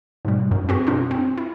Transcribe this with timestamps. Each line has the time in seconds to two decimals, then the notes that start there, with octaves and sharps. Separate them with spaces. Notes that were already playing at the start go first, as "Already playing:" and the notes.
0.25 G#2 B2 G3
0.51 F#2
0.69 C4 F#4 G#4
0.87 B2 C#4 D4 F4
1.11 C4
1.37 E4